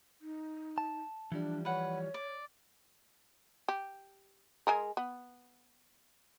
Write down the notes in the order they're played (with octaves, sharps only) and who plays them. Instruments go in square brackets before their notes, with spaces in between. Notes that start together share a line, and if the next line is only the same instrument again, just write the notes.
[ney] D#4
[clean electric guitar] A5
[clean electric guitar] E3 F3 G3 [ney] D4
[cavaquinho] B4 F#5 [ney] C#5
[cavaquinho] D5
[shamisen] G4
G#3 G#4 A#4
B3